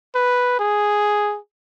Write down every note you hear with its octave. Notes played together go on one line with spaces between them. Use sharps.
B4
G#4